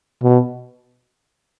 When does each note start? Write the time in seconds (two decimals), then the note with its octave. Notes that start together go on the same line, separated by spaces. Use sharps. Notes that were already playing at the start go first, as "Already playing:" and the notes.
0.23 B2